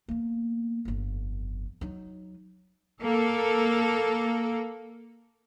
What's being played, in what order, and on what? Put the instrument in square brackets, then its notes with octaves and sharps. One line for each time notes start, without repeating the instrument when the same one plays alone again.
[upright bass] A#3 B3
G1 F2
F#3 D#4
[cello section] A#3 A4